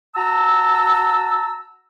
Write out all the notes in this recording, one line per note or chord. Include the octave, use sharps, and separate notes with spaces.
F#4 A5 A#5 E6